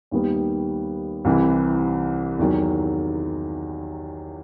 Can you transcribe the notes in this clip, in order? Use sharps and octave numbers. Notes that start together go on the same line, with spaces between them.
D#2 D#3 G3 B3
C2 C3 E3
E2 D#3 F#3